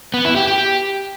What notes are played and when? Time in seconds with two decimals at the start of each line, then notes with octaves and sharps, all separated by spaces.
0.14 B3
0.25 E4
0.36 G4
0.48 G4